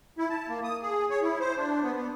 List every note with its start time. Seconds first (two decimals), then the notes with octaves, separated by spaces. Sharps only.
0.18 E4
0.30 A5
0.49 A#3
0.64 D#6
0.82 G#4
1.10 C#5
1.22 E4
1.40 C5
1.57 D4
1.83 B3
1.96 B3